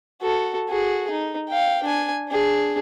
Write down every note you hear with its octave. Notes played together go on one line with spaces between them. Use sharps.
F#4 A4
F#4 G#4
D#4
F5 G5
D4 G#5
D4 G#4